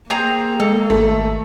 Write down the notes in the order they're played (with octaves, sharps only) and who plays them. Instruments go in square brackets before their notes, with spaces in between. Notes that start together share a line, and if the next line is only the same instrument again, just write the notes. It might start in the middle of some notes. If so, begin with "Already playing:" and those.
[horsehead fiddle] A#3 [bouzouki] C4 G#4 A#5
[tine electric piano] G#3 [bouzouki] A4
[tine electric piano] G#1 E5 [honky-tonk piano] A3